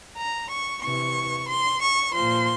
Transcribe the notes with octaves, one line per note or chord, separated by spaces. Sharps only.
A#5
C#6
C3 E3 C#6
C6
C#6
A#2 F3 C6